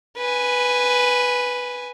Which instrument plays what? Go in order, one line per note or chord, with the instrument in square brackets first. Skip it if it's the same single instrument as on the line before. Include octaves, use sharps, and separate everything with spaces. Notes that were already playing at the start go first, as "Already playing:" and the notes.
[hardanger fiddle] B4 G#5